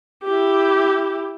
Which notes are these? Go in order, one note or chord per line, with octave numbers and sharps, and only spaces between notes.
E4 G4